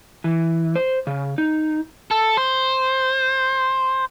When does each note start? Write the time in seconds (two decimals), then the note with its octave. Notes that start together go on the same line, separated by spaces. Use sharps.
0.24 E3
0.75 C5
1.07 C#3
1.38 D#4
2.11 A4
2.37 C5